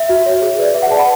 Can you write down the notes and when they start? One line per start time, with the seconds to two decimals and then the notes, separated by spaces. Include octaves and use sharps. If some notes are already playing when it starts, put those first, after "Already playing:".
Already playing: E5
0.09 F#4
0.26 C#5
0.42 G#4
0.58 B4 D5
0.75 G#4 E5
0.82 F#5
0.91 B4 D5 A5
0.99 B5